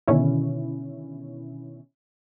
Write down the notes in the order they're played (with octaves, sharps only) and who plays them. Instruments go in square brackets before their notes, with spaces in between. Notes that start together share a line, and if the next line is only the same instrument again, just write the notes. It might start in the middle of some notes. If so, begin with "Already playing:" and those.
[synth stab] B2 D3 D#3 C#4 E4